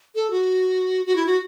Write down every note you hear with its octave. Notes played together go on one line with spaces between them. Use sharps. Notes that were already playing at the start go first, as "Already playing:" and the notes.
A4
F#4
F#4
E4
F#4